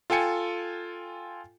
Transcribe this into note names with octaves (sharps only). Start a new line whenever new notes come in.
F4 A4 G5 G#5 C#7